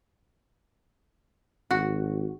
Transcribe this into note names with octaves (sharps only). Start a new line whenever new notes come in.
G#1 F#4